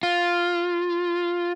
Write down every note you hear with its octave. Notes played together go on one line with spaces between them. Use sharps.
F4